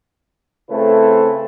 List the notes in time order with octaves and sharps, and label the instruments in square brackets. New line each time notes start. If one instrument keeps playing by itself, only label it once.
[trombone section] C#3 A3 C4 E4 A4 B4